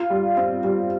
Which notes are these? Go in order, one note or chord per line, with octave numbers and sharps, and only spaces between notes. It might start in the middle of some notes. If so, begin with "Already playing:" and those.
Already playing: F4
G3
C4
G3